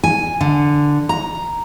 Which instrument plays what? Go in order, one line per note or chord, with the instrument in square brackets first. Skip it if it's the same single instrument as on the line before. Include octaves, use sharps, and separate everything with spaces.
[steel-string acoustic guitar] G#5
D3
A#5